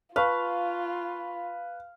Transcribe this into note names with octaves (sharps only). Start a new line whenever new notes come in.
F4 B4 F5 A5 C#6